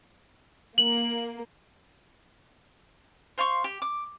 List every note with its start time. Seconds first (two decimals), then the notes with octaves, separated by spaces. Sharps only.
0.78 A#3 F#7
3.38 C5 F5 C6 C#6
3.64 G4
3.82 D6